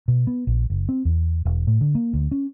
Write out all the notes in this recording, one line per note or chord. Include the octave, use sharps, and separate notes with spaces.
B2
B3
A#1
F#1
C4
E2
E1
A2
D3
A#3
D2
C#4